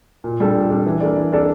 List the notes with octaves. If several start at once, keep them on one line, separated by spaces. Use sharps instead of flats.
A#2
G3 D4 A4
A#2
G3 D4 A4
E3
A#3 D4 A4 D5
E3
A#3 D4 A4 D5